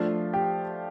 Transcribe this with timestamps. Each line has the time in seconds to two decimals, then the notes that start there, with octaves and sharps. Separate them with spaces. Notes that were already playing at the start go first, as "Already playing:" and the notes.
Already playing: F3 A3 D4 F4
0.33 G4